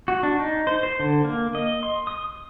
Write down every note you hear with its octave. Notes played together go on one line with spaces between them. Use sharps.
F#4
D4
D#4
C5
C5
D3
A#3
D#5
C6
D#6